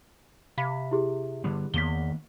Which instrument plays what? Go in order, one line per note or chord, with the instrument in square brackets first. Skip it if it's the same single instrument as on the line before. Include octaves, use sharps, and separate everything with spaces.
[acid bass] C3 [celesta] F5 B5 B6
[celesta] E4 G4 G#4
[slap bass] D3 G3 B3
[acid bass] E2 [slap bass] D#3 A#3 B3 [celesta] B6 G7